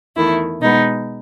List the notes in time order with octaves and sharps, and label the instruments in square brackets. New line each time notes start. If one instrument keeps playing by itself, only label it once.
[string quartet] E2 D#3 A3 E4
B2 G#3 B3 D#4